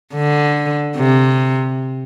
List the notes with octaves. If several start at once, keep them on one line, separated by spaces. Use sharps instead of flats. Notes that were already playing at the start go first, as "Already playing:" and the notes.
D3
C3